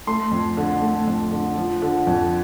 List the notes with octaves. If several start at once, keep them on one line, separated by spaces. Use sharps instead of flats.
A3 C6
F2
D3
A3
F2
D3
F3
D3
F2